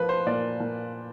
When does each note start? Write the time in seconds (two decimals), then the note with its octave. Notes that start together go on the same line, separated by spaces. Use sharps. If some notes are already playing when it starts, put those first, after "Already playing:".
Already playing: F3 B4
0.09 C5
0.26 A#2 D5
0.60 A#2